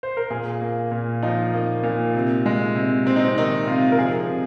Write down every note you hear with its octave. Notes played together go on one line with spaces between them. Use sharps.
C5
A#4
A#2 G#4
A#3
A#2
F3 D#4
A#3
A#2
C3
G#3
C3
C3 C4
D#4
C4
D#3 D#4
C3 F4
A#4
F3 G#4
C3